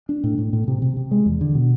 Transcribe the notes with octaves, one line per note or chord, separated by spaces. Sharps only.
D4
A2
A2
A2
C3
C3
C3
G#3
E2
D3
B2